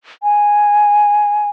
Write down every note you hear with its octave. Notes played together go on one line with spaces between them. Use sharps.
G#5